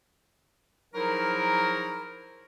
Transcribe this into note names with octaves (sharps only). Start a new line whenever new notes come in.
F3 F#3 D#4 E4 G#4 A#4